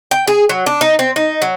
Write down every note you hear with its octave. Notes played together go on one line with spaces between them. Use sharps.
G5
G#4
F#3
D4
D#4
C4
D#4
F#3